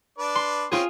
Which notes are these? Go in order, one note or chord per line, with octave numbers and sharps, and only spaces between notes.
D4 B4 D5
C6
C4 C#4 F4 G#4